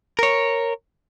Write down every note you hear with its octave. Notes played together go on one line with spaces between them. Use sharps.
A#4 C#5